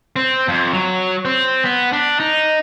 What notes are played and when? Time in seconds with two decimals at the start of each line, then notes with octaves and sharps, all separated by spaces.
0.16 C4
0.48 F2
0.73 F#3
1.25 C4
1.65 B3
1.93 D4
2.20 D#4